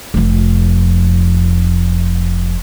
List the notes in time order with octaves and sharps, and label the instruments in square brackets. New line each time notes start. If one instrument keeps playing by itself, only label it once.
[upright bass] F1 F2